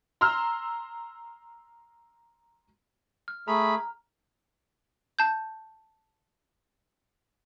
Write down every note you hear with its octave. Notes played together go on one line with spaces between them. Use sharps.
A#5 C6 E6 F6
F6
A3 G#4 A#5 B5
A5 G6